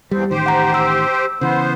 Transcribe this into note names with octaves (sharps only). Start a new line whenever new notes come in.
E2 G3 C4
A1 D#3 G4 C5
F#5 A#5
E6
C#3 E3 B3 C5